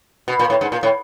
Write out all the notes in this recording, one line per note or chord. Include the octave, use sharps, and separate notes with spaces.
B2
A#2
A2
G#2
A#2
A2